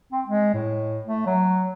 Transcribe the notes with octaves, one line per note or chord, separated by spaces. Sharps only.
C4
G#3
A2
A3
F#3